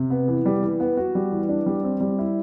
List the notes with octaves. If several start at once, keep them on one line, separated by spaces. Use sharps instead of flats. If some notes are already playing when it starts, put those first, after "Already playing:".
Already playing: C3
B3
E3
G3
E3
B3
F#4
G3
E3
D4
G3
C4
G3
E4